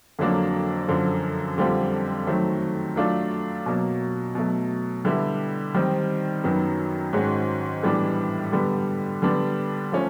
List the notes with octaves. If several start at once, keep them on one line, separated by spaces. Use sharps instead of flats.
F2 D3 F#3 A#3 D4
F#2 D3 F3
F2 D3 G3 C4 F4
D#3 F#3 A3 C4
F#3 A3 D4 F4
B2 F#3 A#3
B2 F#3 A3
D3 G3 B3 E4 G4
D#3 G3 C4 D#4
F#2 D#3 F#3 B3
G#2 D#3 G#3 C#4 F#4
A2 E3 G3 B3 D4
D3 G3 B3
D3 G3 B3 D4
F3 A3 C#4